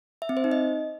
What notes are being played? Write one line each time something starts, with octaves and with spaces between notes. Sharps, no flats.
E5
C4
C5
D#4
D#5